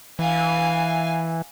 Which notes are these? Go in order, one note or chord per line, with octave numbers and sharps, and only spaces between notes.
E3 F5 G#5